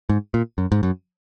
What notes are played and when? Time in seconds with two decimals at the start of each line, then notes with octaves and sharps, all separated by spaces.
0.09 G#2
0.34 A#2
0.58 F#2
0.72 G#2
0.83 F#2